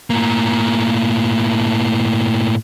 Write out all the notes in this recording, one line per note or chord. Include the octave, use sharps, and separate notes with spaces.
A2 A#3